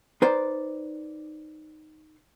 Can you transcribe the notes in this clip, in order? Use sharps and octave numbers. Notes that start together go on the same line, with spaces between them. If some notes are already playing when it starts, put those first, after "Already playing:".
D#4 B4 C5 D5